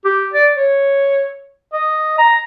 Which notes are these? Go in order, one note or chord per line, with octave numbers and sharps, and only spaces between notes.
G4
D5
C#5
D#5
A#5